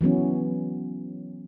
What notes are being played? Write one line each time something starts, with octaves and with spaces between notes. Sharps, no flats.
E3 F#3 B3 C#4